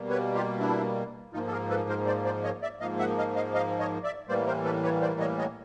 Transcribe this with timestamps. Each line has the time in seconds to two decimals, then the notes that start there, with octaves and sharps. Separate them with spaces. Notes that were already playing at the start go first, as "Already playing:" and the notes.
Already playing: B2 G3 A#3
0.10 B4 C#5
0.35 F4 G4
0.60 D4 E4
1.33 G#2 F3 A#3 D#4 F4
1.47 A4
1.52 G#4 A#4
1.69 A4 B4
1.89 A#4 C5
2.07 C5 D5
2.25 C5 D5
2.44 C#5 D#5
2.62 D5 E5
2.80 G#2 F3 A#3 D#5 F5
2.99 E5 F#5
3.18 D#5 F5
3.36 D#5 F5
3.54 D#5 F5
3.79 C#5 D#5
4.03 D5 E5
4.28 A2 E3 G3 A#3 C5 D5
4.47 A#4 C5
4.65 A4 B4
4.83 B4 C#5
5.01 C5 D5
5.20 C#5 D#5
5.38 C#5 D#5